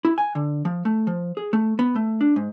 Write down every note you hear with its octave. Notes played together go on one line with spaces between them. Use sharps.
E4
G#5
D3
F3
A3
F3
G#4
A3
B3
A3
D4
G#2